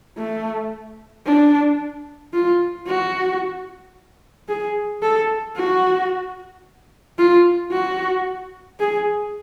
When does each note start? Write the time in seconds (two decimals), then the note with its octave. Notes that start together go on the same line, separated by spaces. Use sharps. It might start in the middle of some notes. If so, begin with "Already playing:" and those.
0.18 A3
1.26 D4
2.33 F4
2.87 F#4
4.49 G#4
5.03 A4
5.56 F#4
7.19 F4
7.72 F#4
8.80 G#4